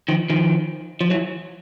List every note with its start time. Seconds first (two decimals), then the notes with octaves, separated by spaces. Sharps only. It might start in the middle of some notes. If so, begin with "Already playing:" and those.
0.08 D#3 F3
0.30 D#3 F3
1.01 F3
1.10 E3 F#3